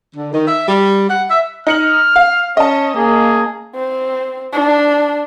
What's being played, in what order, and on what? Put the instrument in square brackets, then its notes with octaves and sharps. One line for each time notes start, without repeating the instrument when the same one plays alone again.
[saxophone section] D3
D#3
E5
G3
F#5
E5
[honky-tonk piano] D#4 C#7 F#7 [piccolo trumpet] F6
[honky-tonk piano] F5
[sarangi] C#4 [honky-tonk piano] D#5 A5
[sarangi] A#3 [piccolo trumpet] G#4
[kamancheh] C4
D4